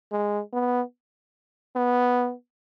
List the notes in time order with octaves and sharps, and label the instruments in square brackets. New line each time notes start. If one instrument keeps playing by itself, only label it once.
[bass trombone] G#3
B3
B3